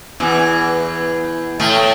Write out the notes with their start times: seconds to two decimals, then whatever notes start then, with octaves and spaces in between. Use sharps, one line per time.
0.20 E2 E3
1.60 A2 A3